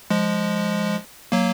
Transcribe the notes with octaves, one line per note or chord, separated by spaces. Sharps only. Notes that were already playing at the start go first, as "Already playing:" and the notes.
F3 G#3
F#3 A#3